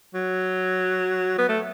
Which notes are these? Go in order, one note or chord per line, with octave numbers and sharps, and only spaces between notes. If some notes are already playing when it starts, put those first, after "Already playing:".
F#3
B3
A3